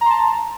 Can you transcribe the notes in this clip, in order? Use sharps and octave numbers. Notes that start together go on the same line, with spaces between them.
A5 A#5 C6